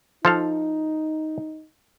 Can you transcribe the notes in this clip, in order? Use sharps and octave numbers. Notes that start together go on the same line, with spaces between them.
F3 D#4 A4 F5